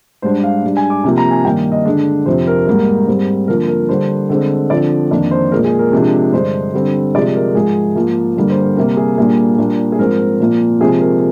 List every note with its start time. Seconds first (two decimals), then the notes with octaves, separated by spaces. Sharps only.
0.22 G#2 G3 D4 C5
0.43 F5
0.63 G#2 G3 D4
0.77 G#5
0.90 D6
1.04 C3 F3 A#3
1.18 A#5
1.31 G#5
1.45 G2 D#3 A#3 G5
1.72 D#5
1.85 D3 G#3 D4
2.26 F2 C3 F3 C4 C5
2.47 A#4
2.67 G#2 G3 A#3 A#4
3.07 G#2 G3 C4
3.48 D3 F3 A#3 A#4
3.68 A#4
3.89 D3 G3 D4 C5
4.30 D3 G#3 C4
4.70 D3 F3 C4 D5
5.11 F2 D#3 A#3 D4 D5
5.31 C5
5.52 A#2 F3 G#3 A#4
5.65 G#4
5.79 A#4
5.92 C3 F3 G#3 D4
6.32 G2 D3 G#3 D4 C5
6.74 D3 G3 C4
7.15 C3 F3 G#3 D5
7.35 A#4
7.55 G#2 F3 G#3 G#4
7.95 G#2 F3 A#3
8.36 G2 D3 G3 A#3
8.50 C5
8.63 A#4
8.77 C3 G3 A#3 A#4
8.97 G#4
9.18 A#2 G3 A#3 D4 G#4
9.58 A#2 G3 A#3 D4
9.92 G#4
9.99 G#2 F3 C4 A#4
10.40 A#2 F3 A#3
10.80 C3 F3 G#3 C4 G#4
11.01 A#4